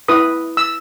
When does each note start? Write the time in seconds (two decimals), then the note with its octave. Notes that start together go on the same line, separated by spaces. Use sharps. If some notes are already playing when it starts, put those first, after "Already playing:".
0.08 E4 B4 D#6
0.57 E6